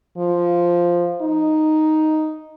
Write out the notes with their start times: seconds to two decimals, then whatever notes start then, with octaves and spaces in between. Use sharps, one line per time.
0.18 F3
1.22 D#4